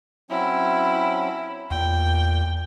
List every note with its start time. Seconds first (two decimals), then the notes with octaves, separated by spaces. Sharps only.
0.30 F#3 C4 C#4 E4
1.71 E2 A#2 G5